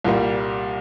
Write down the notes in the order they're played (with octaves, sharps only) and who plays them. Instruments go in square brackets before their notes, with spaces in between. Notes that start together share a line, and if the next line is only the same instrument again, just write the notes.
[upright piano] C2 A#2 G3 A#3